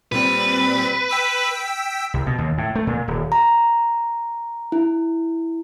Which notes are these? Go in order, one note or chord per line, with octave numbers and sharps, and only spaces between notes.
A#2 G3 C4 B4
G5 E6 B6
C2
B2
D#2
A2
A3
A#2
D#1
A#5
E4